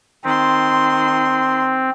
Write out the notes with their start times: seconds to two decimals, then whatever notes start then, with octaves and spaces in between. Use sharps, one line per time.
0.24 D#3 C4 C6